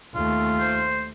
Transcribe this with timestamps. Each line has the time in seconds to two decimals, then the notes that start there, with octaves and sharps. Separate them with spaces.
0.15 D#2 A3 F4
0.60 C5